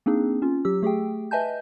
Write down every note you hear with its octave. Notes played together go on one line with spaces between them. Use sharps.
A#3 C4 D4 D#4 G#4
C#4 F4
F#3 G4 E6
A3 G4 G#4 G5
B4 D#5 E5 G#5 A5 G6